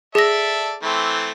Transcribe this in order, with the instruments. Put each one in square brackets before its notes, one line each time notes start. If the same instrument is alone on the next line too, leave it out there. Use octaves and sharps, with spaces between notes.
[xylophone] G#4 A#6 [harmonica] A4 D5 E5
[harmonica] E3 A3 C4